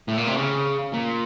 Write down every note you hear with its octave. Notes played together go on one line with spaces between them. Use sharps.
A2
A#2
C3
C#3
A#2